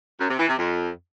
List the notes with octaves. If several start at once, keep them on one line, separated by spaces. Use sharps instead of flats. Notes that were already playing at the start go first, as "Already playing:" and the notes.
F#2
C3
E3
C3
F2